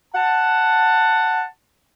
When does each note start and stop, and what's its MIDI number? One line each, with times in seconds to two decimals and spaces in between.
0.15 1.42 78
0.15 1.42 81